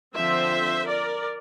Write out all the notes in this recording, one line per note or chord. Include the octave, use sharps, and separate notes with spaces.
D3 F3 C4 C5 E5
A#4 D5